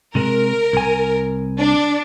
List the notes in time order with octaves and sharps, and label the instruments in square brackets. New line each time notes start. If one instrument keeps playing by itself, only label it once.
[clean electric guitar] C3 G#3 [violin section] A#4
[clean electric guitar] C2 G#5
[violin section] D4